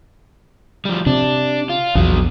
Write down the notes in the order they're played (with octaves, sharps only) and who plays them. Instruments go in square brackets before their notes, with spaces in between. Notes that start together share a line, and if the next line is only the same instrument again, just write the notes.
[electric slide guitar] F3 G3
[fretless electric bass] C3 [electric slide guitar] D4
[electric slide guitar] F4
[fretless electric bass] A#1 E2 [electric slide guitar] F#3 B3